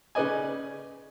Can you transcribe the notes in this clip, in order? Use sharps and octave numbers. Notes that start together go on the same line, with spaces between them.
C#3 D#4 B4 D5 D#5 G#5